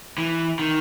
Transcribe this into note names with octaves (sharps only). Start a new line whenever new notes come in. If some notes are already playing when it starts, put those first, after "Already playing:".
E3
D#3